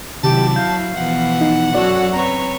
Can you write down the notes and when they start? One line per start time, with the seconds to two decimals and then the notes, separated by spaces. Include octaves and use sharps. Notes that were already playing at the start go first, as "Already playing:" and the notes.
0.23 C3 D#3 F#3 E4 G4 A5
0.56 F5 G6
0.96 B2 E3 F3 F#5
1.41 D#4
1.75 F#2 F#4 A4 C#5 D5
2.12 C4 B4 C#5 A#5